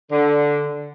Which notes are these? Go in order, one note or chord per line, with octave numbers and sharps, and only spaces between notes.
D3